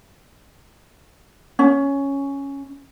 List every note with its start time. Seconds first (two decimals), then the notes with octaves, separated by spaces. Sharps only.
1.59 C#4